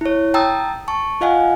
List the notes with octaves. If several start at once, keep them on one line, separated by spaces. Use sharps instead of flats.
E4 C#5
G5 A5 A#5 D#6 E6 A6
A5 C#6
F4 D#5 F5 F#5 G#5